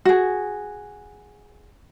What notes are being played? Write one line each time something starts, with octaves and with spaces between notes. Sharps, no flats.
F#4 G#4